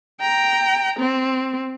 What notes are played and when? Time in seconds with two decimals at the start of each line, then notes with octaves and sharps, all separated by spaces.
0.21 G5 A#5
0.99 C4